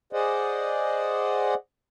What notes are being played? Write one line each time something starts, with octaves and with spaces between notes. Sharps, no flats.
G#4 C5 D5 D#5 F#5